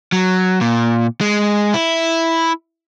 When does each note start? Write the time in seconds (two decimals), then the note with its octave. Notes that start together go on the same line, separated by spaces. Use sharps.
0.12 F#3
0.61 A#2
1.21 G#3
1.74 E4